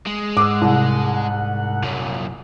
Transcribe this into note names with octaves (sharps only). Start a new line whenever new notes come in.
G#3
G#2 F#5 D6 E6
C2
F#2 A#2